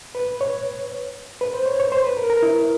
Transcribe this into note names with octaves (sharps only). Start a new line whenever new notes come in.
B4
C#5
B4
C5
C#5
C#5
C5
B4
A#4
A#4
E4